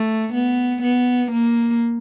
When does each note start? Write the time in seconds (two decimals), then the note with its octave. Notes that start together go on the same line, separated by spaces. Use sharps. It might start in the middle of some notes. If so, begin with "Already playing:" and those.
Already playing: A3
0.34 B3
0.83 B3
1.32 A#3